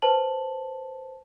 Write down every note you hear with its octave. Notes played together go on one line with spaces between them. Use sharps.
B4 C5 A5 F#7